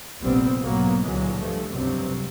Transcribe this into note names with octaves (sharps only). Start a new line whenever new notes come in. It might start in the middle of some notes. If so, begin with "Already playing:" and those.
F1 A#1 G3 B3 C4
B1 G#2 F#3 A#3 B3
C#2 A#2 D3 E3 F#3 G#3
G2 F3 G#3 A3
F1 C#2 G2 C3 F#3 C4